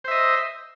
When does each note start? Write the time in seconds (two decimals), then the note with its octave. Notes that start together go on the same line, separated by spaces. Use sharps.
0.04 C5
0.08 E5
0.11 D#5